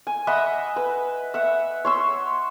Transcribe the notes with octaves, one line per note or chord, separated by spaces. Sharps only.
G#5
D#5 E5 F#5 B5
B4
E5 F#5
C#5 C6 E6